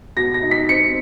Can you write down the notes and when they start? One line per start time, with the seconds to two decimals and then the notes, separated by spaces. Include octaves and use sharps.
0.17 B2 A#6
0.34 A#6
0.42 D#4
0.51 B6
0.69 C4 C#7